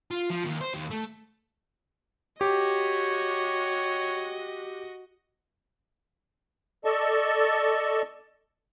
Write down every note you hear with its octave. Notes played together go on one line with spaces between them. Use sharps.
F4
F3
D#2
C5
D#2
A3
F#4 G4 C#5 D#5
A4 D5 D#5 A5 C#6